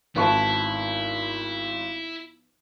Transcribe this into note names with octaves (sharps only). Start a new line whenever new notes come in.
G#1 F3 B3 E4 C#6